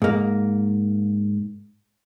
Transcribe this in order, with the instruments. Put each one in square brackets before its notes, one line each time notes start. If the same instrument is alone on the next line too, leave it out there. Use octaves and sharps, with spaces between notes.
[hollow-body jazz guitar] G#2 A#3